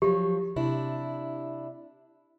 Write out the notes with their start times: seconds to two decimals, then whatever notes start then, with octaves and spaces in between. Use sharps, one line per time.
0.02 F3 F#3 G4
0.56 C3 D4 E4